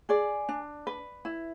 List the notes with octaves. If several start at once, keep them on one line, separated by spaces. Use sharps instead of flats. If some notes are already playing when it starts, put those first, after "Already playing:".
G#4 D5
D4
B4
E4